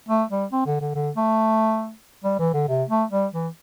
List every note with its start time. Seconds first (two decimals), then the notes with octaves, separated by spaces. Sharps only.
0.09 A3
0.30 G3
0.52 C4
0.66 D3
0.81 D3
0.95 D3
1.17 A3
2.25 G3
2.39 E3
2.54 D3
2.68 C3
2.89 A3
3.11 G3
3.33 E3